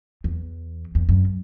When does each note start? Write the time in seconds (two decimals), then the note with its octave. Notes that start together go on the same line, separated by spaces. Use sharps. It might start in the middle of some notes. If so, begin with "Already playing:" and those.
0.24 E2
0.95 E2
1.09 F#2